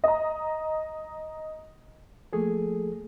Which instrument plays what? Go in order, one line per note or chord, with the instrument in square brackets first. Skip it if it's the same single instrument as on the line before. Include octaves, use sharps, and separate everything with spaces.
[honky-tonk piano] D#5 A#5
[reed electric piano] F3 A3 A#3 G#4 A4